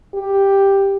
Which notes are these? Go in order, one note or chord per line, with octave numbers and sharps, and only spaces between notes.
G4